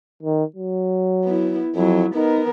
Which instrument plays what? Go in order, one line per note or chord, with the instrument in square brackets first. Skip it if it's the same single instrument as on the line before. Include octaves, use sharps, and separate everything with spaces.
[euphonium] D#3
F#3
[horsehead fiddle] B3 E4
[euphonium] F2 [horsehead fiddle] F#3 E4
[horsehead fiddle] B3 A#4 [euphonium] D#4